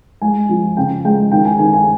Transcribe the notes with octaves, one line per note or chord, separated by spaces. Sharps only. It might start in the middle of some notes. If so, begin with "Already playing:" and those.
G#3 G#5
F3
C#3 G5
G#3 G5
D#3 G5
G#5
D#3 G#5
G#5